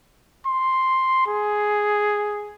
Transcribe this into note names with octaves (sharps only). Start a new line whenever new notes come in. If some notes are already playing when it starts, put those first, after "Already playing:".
C6
G#4